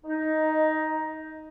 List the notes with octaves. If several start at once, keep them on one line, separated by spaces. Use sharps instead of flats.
D#4